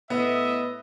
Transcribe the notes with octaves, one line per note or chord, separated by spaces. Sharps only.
A2 B3 D#5 E5